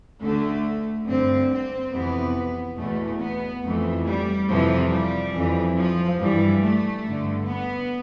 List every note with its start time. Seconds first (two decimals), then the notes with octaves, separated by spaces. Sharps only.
0.22 D2 D3 A3
1.07 G2 D3 C4
1.50 C4
1.93 F2 C3 E3 B3
2.78 E2 B2 A3
3.20 B3
3.63 F2 E3 A3
4.06 G3
4.48 F2 C3 E3 F3
4.91 G3
5.34 F2 E3
5.77 F3
6.19 G2 E3 G3
6.62 A3
7.05 G2 D3
7.47 B3